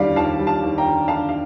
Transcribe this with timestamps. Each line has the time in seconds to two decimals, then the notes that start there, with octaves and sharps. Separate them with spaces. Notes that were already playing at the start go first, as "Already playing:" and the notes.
Already playing: D#2 D3 G3 D5 F5
0.16 D#2 F5 A5
0.39 G3
0.47 F5 A5
0.63 D#2
0.78 G5 A#5
0.85 D3
1.08 D3 F5 A5
1.29 F5